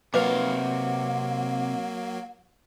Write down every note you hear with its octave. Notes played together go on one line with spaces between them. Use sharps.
C3 F#3 A#3 B4 D#5 F5 F#5 D6